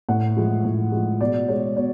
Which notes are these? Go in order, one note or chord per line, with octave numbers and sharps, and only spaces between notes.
A2 F#5
F3 G#3
A2
F3 G#3
B2 D5
G#3 C#5
B2 C#5